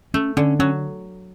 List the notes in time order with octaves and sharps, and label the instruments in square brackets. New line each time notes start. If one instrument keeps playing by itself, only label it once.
[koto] A3 [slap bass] C#4
[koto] D3 [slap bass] C#4
[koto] F#3 [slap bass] C#4